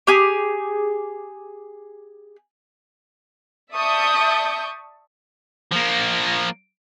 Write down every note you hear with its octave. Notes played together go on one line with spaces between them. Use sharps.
G4 G#4
D5 E5 A5 C#6 D#6 G6
F3 A#3